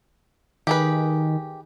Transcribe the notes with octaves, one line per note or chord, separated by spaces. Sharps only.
D#3 G4 G#4 B4